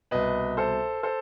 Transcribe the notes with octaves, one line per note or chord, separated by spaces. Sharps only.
C2 B2 B4 D#5
A4 C5
A4 C5